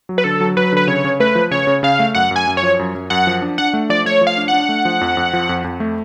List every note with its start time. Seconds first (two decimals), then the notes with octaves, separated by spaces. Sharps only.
0.09 F#3
0.18 B4
0.24 D3 A4
0.41 F#3
0.57 F#3 B4
0.72 D3 B4
0.87 C#3 C#5
1.04 C#3
1.20 A3 B4
1.35 F3
1.51 C#3 C#5
1.67 C#3
1.83 C#3 F5
1.99 A3
2.15 F#2 F#5
2.31 F#2 G#5
2.47 F#2
2.57 C#5
2.63 F3
2.79 F#2
2.95 F#2
3.10 F#2 F#5
3.27 F3
3.42 D4
3.58 D4 F#5
3.74 A3
3.89 F3 D5
4.05 A3 C#5
4.21 F3
4.27 F5
4.37 D4
4.48 F#5
4.53 D4
4.69 A3
4.85 F3
5.01 F2
5.17 F2
5.33 F3
5.49 F2
5.64 F2
5.80 A3